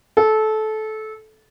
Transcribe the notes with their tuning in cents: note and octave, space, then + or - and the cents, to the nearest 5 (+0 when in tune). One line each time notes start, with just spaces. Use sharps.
A4 -20